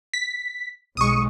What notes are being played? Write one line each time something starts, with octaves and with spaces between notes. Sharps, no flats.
B6
B1 G#3 C#6 D#6